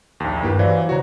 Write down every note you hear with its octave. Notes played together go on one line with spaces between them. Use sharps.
A#1 D#2
G2 A#3 E4 G4 B4
E3 F#3 C5 D5 F5
C#3 F#4 C5 C#5 A#5